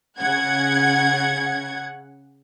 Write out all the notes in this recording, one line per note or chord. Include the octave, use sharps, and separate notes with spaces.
C#3 F#5 G#6